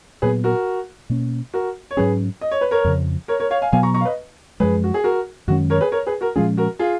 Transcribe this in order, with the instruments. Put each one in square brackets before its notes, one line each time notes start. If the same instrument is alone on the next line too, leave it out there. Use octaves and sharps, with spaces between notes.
[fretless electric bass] A#2 F#3 B3 [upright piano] G#4 B4
[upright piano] F#4 A#4
[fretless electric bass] B2 A#3 C#4
[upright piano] F#4 A#4
C#5
[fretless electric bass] G#2 F#3 C#4 [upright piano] G#4 B4
[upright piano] D#5
C#5
B4
A#4 C#5
[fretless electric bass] F2 C#3 F3
[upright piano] A#4 C#5
A#4 C#5
C#5 F5
F5 G#5
[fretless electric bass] B2 F#3 B3 [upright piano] F5 G#5
[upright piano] A#5 C#6
A#5 C#6
F5
B4 D#5
[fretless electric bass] F#2 F3 G#3 [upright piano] G#4 B4
[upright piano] F#4
G#4
F#4 A#4
[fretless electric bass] F#2 D#3 G#3 C#4 [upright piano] F#4
[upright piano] A#4 C#5
G#4 B4
A#4 C#5
G#4 B4
F#4 A#4
[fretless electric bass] A#2 F3 G#3 C#4 [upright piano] F4 G#4
[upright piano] F#4 A#4
F4 G#4